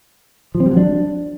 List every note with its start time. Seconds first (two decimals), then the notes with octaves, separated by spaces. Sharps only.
0.55 F3
0.60 C4
0.66 G3
0.71 F#3
0.77 D4